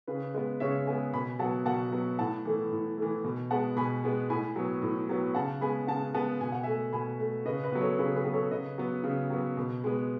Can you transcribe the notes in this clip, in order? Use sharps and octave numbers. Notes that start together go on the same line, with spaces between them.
C#3 G#4 B4
G#3 B3 B4 D#5
C#3 C#5 E5
G#3 B3 E5 G#5
B2 G#5 B5
F#3 B3 F#5 A5
B2 F#5 A5
F#3 B3
A2 F#5 A5
E3 A3
A2
E3 A3
B2
G#3 B3 F#5 A5
B2 G#5 B5
G#3 B3
A2 G#5 B5
F#3 B3
A2
F#3 B3
C#3 F#5 A5
G#3 B3 G#5 B5
C#3 F#5 A5
G#3 B3 F#5 A5
B2 G#5
F#5
A3 E5 G#5
B2 G#5 B5
A3
C#3 B4 D#5
B4 D#5
F#3 B3
A4 C#5
C#3 G#4 B4
G#4 B4
F#3 B3
A4 C#5
C#3 B4 D#5
F#3 B3
C#3
F#3 B3
B2
G#3 B3